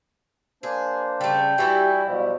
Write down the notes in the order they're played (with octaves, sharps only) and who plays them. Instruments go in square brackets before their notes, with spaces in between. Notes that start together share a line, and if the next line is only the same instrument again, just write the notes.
[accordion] A#3 D4 C5 [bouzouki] G#4
[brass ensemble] C#3 [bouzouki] G3 A3 [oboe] G5
[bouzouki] E3 G3 E4 [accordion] F#4 E5 G#5 [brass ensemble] G4
[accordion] B2 F3 F#3 [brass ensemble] D5 F5